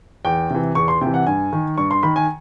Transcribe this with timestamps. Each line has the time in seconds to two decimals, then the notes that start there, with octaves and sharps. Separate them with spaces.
0.25 E2 G5
0.50 C3 E3
0.75 E2 C#6
0.88 C6
1.01 C3 G5
1.06 E3
1.14 F#5
1.26 G2 G#5
1.53 D#3
1.77 G2 C#6
1.91 C6
2.03 D#3 B5
2.16 G#5